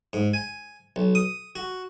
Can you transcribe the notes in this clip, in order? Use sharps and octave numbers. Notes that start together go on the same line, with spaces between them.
G#2
G#5
B1
D#6
F#4